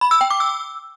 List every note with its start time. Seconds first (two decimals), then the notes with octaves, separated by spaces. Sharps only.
0.01 B5
0.11 E6
0.21 G5
0.30 D6
0.40 E6